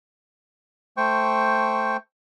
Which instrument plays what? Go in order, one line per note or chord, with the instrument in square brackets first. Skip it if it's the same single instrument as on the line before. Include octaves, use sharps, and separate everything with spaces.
[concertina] A3 C5 G5 C#6